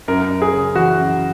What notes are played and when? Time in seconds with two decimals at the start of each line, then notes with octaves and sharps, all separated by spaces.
0.08 F#2 A#4
0.31 F#2
0.42 G#4
0.53 C#3
0.76 E3 F#4
0.98 F#2